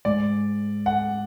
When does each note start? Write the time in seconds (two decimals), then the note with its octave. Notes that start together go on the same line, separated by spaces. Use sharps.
0.05 G#2 G#3 D5
0.86 F#5